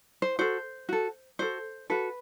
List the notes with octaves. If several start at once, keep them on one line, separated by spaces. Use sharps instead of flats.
C5
F#4 A4 C5
F#4 A4
F#4 A4 C5
F#4 A4 B4